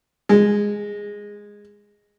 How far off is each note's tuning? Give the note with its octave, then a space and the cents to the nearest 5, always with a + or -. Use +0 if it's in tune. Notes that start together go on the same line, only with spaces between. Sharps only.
G#3 -10